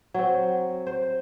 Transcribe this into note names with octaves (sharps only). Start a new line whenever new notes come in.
F#3 C4
C5